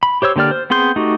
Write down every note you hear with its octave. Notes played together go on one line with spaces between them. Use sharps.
B5
G4 C5 C#5 E6
D3 A#3 G4 D5 F6
C5
B3 C4 G#4 C6 G6
A3 D#4 F#4 G4